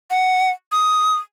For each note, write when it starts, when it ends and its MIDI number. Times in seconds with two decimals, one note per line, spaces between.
0.10 0.50 78
0.72 1.16 87